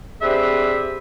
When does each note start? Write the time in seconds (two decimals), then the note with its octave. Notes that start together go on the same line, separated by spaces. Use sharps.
0.22 C4 D4 G4 G#4 B4 E5